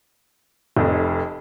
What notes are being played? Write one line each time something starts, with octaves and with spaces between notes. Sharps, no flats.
F1 F2